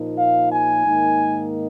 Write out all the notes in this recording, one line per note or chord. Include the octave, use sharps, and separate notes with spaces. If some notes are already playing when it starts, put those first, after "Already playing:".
Already playing: A#2 F3 A#3 D#4
F5
G#5
G#2 D#3 A#3 D#4